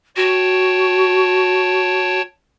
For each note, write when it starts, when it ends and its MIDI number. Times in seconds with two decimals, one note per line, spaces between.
0.16 2.20 66
0.16 2.22 73
0.16 2.22 79
0.16 2.22 81